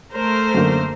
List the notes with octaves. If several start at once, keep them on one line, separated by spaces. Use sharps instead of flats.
A3 A#4 C5
F#2 D3 A#3